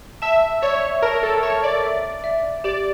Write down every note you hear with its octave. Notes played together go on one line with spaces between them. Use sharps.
E5 A5
C#5 D5
A#4 A5
A4
C#5 A5
D5
E5
E5
G4 D5